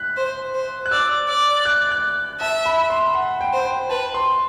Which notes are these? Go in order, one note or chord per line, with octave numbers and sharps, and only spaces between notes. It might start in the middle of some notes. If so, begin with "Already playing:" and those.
Already playing: F#6 B6
C5
C5
F#6
D5 E6
D5
F#6
F#6
E5 A5
B5
C6
F#5
G5
C5
G5
B4 A5
C6